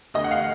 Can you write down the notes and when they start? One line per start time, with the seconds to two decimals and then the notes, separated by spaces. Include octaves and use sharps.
0.14 D2 D#5
0.24 F#5
0.31 F5